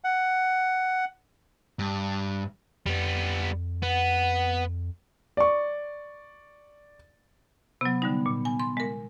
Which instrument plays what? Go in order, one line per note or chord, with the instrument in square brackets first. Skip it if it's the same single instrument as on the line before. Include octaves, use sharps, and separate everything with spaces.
[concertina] F#5
[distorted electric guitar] G2
[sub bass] F2 [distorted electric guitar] G3 B3
[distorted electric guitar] B3 [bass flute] F#5
[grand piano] D5 C#6
[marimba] C3 F#3 [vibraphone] B3
[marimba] D3 G3 D#4
A#2
G#5
C6
G#3 A#4